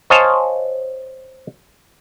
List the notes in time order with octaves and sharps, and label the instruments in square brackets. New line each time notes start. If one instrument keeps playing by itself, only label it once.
[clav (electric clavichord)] C5 C#5 D#5 F5 G#5 A5